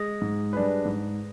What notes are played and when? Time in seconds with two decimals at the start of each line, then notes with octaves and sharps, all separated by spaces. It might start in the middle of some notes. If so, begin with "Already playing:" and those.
Already playing: G#3
0.22 G#2
0.53 G3 D4 G#4 B4
0.85 G#2